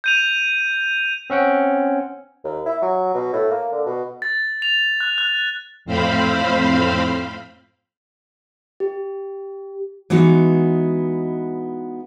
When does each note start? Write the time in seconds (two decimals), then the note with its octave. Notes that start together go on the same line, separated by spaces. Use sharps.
0.04 G6 D#7 F7
1.30 C4 C#4 F#5 G5
2.44 D#2
2.65 E4
2.82 F#3
3.14 B2
3.33 A2
3.51 A#3
3.72 D3
3.86 B2
4.22 A6
4.62 F7
5.00 F#6
5.18 F#6
5.85 F2 A2 C4 C5 F5 B5
8.80 G4
10.10 E3 G#3 B3 D#4 F#4